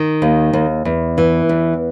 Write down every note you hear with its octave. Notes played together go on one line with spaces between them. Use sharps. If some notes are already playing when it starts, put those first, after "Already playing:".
Already playing: D#3
D#2
D#2
E2
E3
E2